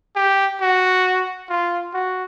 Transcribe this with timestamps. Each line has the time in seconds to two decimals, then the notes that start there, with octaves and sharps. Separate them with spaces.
0.16 G4
0.61 F#4
1.50 F4
1.94 F#4